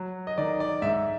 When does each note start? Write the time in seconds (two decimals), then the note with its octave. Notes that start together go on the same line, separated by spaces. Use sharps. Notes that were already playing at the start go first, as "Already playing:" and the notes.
Already playing: F#3
0.27 D#5
0.38 D#3 D5
0.60 D5
0.82 G#2 E5